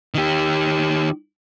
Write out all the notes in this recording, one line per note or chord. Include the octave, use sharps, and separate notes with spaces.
D#3 G4